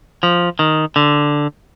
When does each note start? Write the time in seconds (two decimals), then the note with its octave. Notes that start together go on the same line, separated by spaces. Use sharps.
0.23 F3
0.59 D#3
0.96 D3